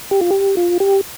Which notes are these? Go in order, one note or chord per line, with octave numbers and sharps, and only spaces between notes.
G4
F4
G4
F4
G4